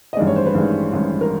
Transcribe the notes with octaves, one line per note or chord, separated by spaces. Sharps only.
D#5
A1 G2 D#3 G#3 D5
C#5
C5
B4
A1 G2 D#3 G#3
A1 G2 D#3 G#3
A#4